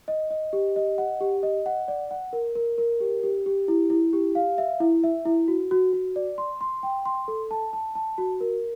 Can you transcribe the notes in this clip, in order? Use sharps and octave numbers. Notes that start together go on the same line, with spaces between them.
D#5
D#5
G4
D#5
F#5
G4
D#5
F#5
D5
F#5
A#4
A#4
A#4
G4
G4
G4
E4
E4
G4
F5
E5
E4
E5
E4
F#4
F#4
F#4
D5
C6
C6
G5
C6
A4
A5
A5
A5
F#4
A#4